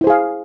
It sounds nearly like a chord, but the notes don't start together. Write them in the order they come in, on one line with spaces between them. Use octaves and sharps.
E4 C5 G#4 F5